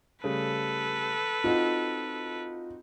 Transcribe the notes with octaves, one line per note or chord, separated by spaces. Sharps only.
C#3 G3 A3 A4 B4
C4 D#4 F4 F#4